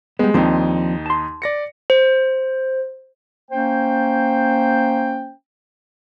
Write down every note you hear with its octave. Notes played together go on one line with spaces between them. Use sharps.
G3 G#3 B3
D#2 F3 C4 D4 D#4
A5 C6
D5 A#6 C#7
C5
A#3 C#4 C5 G5